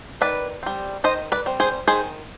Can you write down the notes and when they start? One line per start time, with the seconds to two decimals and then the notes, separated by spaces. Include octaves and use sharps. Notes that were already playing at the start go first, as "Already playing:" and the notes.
0.21 D#3 B4 D5
0.63 G3 C4
1.04 D#3 C5 D#5
1.32 B4 D5
1.46 G3 C4
1.60 G#4 C5
1.87 D#3 G#4 C5